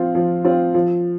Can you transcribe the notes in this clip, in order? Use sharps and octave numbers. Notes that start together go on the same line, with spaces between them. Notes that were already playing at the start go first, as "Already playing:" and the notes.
Already playing: F3 C4 F4
F3
C4 F4
F3